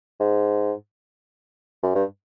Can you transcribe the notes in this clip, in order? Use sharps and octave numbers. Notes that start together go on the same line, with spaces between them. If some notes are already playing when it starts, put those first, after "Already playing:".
G#2
F#2
G2